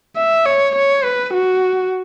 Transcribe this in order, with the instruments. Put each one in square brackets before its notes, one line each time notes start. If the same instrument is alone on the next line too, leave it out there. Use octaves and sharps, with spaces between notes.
[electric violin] E5
C#5
C#5
B4
F#4